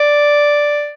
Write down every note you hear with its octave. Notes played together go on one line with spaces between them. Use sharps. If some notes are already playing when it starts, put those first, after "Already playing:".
Already playing: D5